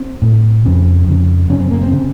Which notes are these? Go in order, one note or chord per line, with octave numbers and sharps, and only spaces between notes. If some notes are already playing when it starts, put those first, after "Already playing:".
Already playing: C4
A2
F2 C#3 C4
F2 C#3
F#2 C#3 C#4
C4
A#3
C4
C#3 C4